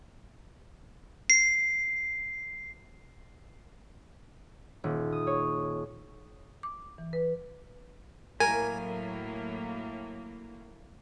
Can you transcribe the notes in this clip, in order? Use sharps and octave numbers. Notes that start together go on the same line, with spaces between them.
C7
D#1
D#6
C#5
D6
E3
B4
A2 F#3 A#3 A#4 G#5